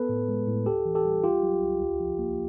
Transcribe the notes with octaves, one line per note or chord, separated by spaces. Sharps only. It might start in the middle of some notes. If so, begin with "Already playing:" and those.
Already playing: B3 A4 B4
A2
G#3
A2
D2 G4 A4
E3
G4 A4
G3
C2 F4 G4
F#3
C2
D2
F3
A#3